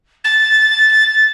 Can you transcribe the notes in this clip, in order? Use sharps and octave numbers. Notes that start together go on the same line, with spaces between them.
A6